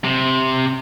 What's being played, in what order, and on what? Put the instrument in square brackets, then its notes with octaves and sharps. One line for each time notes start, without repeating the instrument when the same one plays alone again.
[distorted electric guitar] C3